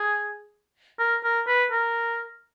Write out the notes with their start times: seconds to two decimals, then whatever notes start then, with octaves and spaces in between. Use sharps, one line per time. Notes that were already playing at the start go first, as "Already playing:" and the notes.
Already playing: G#4
0.99 A#4
1.24 A#4
1.48 B4
1.71 A#4